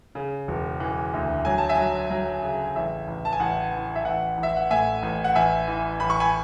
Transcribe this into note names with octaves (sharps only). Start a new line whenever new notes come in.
C#3
E1
E3
D2
F#3 G#5
A5
E5 G#5
F#3
F#3
C#3
A1 E5
A1
A5
G#5
A1 F#5
E3
E5
A1 F#5
A1
E5
F#5
A2 E5 G#5
A1
F#5
A1 E5 G#5
E3
A1 B5
C#6
G#5 B5